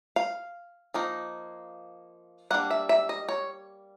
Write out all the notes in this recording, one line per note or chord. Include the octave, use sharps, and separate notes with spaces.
F5
F3 A#3 D#4
G3 A#3 D4 F#5
E5
E5
D#5
C#5